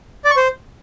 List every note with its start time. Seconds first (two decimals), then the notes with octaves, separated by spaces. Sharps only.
0.25 D5
0.31 C#6
0.37 C5